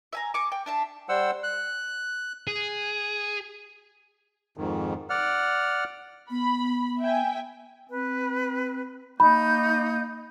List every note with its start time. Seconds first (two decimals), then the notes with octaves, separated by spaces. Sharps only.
0.13 E5 G#5 A#5
0.34 G#5 C#6 D6
0.52 G5
0.66 D4 E5 A5
1.09 G3 C5 F#5 E6
1.43 F#6
2.47 G#4
4.57 F2 G#2 D#3
5.10 D5 F#5 F6
6.30 B3 B5
6.99 E5 G5 G#5
7.90 C4 B4
9.20 A#3 D#4 B5 G6